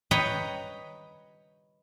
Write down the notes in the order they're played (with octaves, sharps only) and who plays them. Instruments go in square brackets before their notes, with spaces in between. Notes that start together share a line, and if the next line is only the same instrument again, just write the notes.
[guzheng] B4 C#5 D#5 G5 A#5